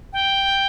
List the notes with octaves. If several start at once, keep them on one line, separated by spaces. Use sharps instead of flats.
G5